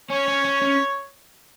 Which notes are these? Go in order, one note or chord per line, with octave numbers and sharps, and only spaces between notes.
C#4 C#5
C#4
C#4
C#4